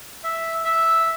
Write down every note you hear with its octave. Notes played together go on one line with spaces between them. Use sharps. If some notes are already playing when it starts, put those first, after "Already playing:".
E5
E5